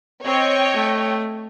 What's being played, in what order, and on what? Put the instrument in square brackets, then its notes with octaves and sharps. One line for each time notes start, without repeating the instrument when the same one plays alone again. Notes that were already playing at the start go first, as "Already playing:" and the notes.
[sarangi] C4 [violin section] C#5 D#5 G5
[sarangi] A3